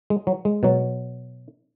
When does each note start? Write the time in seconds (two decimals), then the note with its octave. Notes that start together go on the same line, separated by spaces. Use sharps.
0.10 G#3
0.27 F#3
0.45 G#3
0.63 B2 F#3